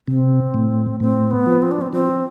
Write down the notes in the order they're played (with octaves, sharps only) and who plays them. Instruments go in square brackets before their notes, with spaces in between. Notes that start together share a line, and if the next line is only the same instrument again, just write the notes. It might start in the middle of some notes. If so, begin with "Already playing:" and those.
[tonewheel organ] C3 [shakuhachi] C4
[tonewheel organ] A2
[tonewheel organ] A2 [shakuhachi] C4
[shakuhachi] B3
[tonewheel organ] F3
[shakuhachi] C4
D4
C4
[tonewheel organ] F3 [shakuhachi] C4